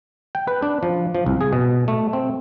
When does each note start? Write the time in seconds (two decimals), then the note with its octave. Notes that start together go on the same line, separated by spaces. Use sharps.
0.35 G5
0.47 B4
0.62 D4
0.83 F3
1.15 F3
1.26 C2
1.41 G#4
1.53 B2
1.88 A3
2.13 C4